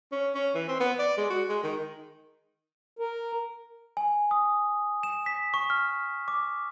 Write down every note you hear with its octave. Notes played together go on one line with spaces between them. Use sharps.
C#4
C#4
E3
C4
B3
D5
G#3
F#4
G#3
D#3
A#4
G#5
D#6
E7
B6
C#6
F6
D6